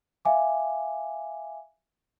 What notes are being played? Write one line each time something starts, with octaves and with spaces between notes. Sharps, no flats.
E5 F5 G#5 D6